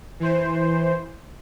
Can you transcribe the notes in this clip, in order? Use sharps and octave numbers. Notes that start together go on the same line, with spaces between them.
E3 C5